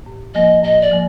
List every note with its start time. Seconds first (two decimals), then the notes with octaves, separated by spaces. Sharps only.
0.06 A2
0.34 F3 A#3 D#5
0.63 A2 D#5
0.82 D5
0.92 F3 A#3